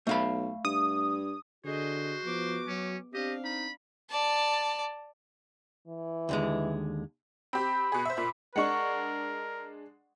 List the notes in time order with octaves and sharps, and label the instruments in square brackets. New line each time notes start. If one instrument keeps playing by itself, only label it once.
[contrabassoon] B1 [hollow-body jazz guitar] A3 F5 B5
[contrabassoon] G2 [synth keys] D#6
[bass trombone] D3 [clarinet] F#4 [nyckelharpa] G#4 D#5 [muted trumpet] C5
[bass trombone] F3 [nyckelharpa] B3 D6
[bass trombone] F#3 [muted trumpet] C#4
[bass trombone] C4 [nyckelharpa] D4 F5 [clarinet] G4 [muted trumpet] D#5
[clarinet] D#4 [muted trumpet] B5
[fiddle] D5 A5
[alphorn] E3
[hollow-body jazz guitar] D#2 D3 G#3
[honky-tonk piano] C4 G4 [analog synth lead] B5
[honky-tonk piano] B2 G#4
C5 E5
[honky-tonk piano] A#2 E5 [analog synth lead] B5
[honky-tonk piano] G#3 D4 [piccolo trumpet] A#4 [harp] F#5 C#6